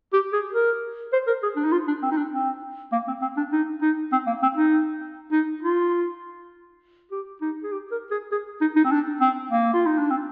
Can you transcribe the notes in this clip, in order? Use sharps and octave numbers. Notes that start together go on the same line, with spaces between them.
G4
G#4
A#4
C5
A#4
G#4
D4
D#4
F4
D4
C4
D#4
D4
C4
A#3
C4
C4
D4
D#4
D#4
C4
A#3
C4
D#4
D#4
F4
G4
D#4
G#4
G4
A#4
G#4
G#4
D#4
D#4
C4
D4
C4
A#3
F4
D#4
D4
C4